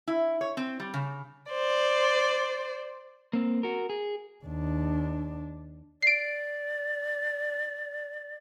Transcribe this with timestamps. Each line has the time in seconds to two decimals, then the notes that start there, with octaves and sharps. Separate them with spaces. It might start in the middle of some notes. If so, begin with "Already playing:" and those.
0.07 E4
0.41 C#5
0.57 C4
0.80 G3
0.94 C#3
1.51 C5 D5
3.33 A#3 C4
3.63 F#4 A#4
3.90 G#4
4.45 D#2 D4
6.02 D5 C7 D7